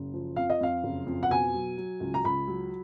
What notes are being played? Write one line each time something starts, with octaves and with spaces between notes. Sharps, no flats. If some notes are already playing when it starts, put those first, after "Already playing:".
Already playing: F#1
F3
F2 F5
D#5
F2 F5
F#1
F2
F#5
B2 G#5
F#3
F#3
C#2
A#5
C#2 B5
F#3